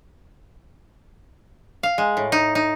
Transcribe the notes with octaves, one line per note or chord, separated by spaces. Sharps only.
F5
G#3
A2
D#4
D#4